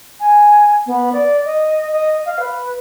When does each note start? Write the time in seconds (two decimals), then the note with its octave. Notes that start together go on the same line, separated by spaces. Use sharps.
0.20 G#5
0.86 B3
1.13 D5
1.45 D#5
1.92 D#5
2.25 F5
2.39 B4